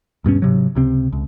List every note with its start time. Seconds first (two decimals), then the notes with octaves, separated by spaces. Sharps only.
0.24 D#1 G2 B2 C#4
0.42 G#2 C3 F#3
0.75 C#2 C3 C4
1.13 C#2